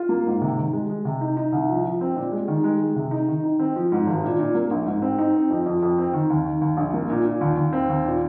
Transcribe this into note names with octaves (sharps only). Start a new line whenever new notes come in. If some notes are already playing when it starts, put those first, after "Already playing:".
Already playing: F4
A#3
G#2
C3
D#3
G#3
G#3
C3
D#4
D#4
C2
F3
F3
C4
A#2
G#3
D#3
G#3
G#3
C3
D#4
D#3
D#4
C4
F3
G#2
G#1
A#2
A#2
A#3
A#1
G#2
C4
D#4
C4
F2
F2
F2
C4
D#3
D#2
D#3
D#2
A#1
A#3
A#2
A#2
D#2
D#2
C4
D#2
A#2